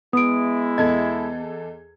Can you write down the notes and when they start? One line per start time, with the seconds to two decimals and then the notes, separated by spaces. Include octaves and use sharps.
0.13 G#3 B3 E4 D#6 D7
0.78 E2 A4 D#5 G#6